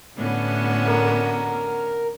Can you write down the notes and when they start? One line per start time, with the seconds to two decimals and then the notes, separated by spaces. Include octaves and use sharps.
0.18 A2 D3 B3 C#4 F#4
0.88 A#4